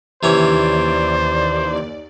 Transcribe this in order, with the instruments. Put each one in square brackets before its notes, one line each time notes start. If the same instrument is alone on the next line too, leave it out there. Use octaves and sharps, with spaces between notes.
[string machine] D#2 D5 [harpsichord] C3 E3 C#4 [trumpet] C5